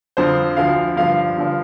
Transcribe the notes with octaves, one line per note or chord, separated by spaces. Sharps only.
F2 D3 F3 C5
D2 D3 F3 F5
G2 D3 F3 F5
G2 D3 F3